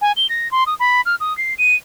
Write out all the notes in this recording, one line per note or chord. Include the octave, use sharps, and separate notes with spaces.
G#5
G7
A#6
C6
D#6
B5
F6
D#6
C7
D#7